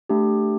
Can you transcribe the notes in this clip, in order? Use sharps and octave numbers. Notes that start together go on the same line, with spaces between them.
A3 D4 G4